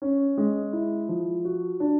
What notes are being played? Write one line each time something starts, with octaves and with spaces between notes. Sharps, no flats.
C#4
G#3
E4
F3
F#4
D4